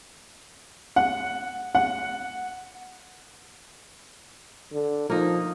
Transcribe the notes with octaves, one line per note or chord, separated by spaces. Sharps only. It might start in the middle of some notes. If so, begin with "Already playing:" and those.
F#5
F#5
D3
F3 A#3 D#4